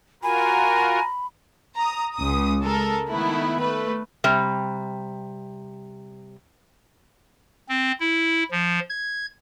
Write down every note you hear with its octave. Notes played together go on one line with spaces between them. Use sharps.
F4 F#4 A#4 G#5 A#5 B5
A#5 D#6
C#2 D#6
G#3 A4 A#4
D#3 A3 B3 E4
A3 B4
C3 G3
C4
E4
F3
G#6